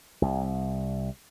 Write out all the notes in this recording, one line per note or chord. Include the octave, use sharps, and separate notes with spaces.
C2